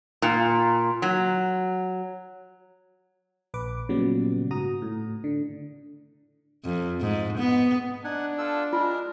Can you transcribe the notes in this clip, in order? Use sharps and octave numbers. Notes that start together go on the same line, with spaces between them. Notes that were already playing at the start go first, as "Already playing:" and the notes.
A#2
F#3
A#1 B4 D6
A#2 C#3 F#3 G3 B3
G#2 F#4 A#5 D#6
A2
D3
F2
G#2
B3
D4 D#4 F#5 G#5
F4 A4 E6
G#3 F4 A#4